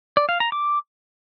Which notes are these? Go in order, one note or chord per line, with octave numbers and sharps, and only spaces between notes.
D5
F5
A#5
D6